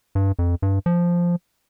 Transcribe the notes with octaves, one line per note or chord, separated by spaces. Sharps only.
G2
F2
G2
F3